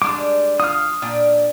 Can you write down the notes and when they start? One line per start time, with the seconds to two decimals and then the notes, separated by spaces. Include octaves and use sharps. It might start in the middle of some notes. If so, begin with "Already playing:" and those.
0.02 G3 G#3 D4 D6
0.60 F4 D#6 F6
1.02 A#2 D4 G5